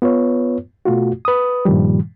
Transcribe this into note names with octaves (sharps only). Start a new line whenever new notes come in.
B3 F4 B4 C#5
B2 A3 F4 F#4
B4 D#6
G2 A#2 D#3 F3 G3